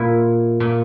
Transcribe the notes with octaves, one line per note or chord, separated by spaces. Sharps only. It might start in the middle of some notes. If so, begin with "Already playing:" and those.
Already playing: A#2 E4
A#2